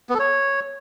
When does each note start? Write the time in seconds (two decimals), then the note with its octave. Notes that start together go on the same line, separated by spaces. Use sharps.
0.09 B3
0.14 A4
0.19 C#5